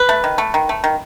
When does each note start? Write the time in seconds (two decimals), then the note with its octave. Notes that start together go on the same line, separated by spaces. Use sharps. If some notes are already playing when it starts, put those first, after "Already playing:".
Already playing: B4
0.09 A3
0.24 D#3
0.38 A3
0.54 D#3
0.69 A3
0.84 D#3